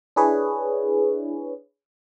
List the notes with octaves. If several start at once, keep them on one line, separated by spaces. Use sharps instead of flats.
D4 E4 G#4 B4 C#5